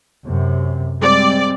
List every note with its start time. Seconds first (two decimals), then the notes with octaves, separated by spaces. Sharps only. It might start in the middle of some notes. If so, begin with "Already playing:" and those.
0.25 F#2 C3
1.01 G3 G#3 C4 D5